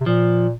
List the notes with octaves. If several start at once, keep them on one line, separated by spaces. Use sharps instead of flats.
C3
A#2 F3